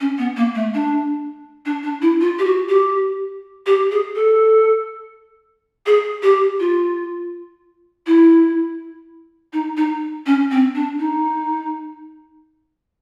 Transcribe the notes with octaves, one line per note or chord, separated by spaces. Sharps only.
C#4
B3
A#3
A3
D4
D4
D4
E4
F4
G4
F#4
G4
G4
G#4
A4
G#4
G4
F4
E4
D#4
D#4
C#4
C4
D4
D#4